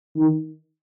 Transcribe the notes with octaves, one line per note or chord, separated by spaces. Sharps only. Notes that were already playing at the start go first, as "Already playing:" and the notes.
D#3